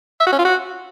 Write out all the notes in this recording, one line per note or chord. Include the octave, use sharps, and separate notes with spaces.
E5
F#4
C#4
F4
F#4